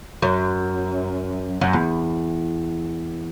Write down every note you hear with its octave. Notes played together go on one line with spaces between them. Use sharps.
F#2
F#2
E2